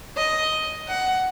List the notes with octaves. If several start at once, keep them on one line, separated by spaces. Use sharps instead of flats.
D#5
F#5